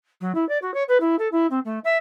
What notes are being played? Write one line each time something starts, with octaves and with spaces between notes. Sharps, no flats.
F#3
E4
D5
F#4
C#5
B4
E4
A4
E4
C4
A3
E5